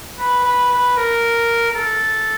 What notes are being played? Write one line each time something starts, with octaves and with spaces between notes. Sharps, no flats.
B4
B4
B4
A#4
A#4
A4